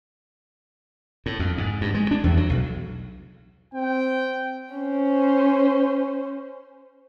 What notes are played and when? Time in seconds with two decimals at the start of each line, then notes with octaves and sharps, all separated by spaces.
1.26 A2
1.39 F2
1.58 G#2
1.81 G2
1.94 G#3
2.11 D4
2.24 E2
2.37 F#3
2.49 B1
3.74 C4 G5
4.75 C#4 C5